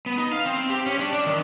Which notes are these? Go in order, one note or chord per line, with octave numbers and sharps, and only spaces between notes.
B3
D#4
F5
C4
G4
C#4
D4
D4
D#3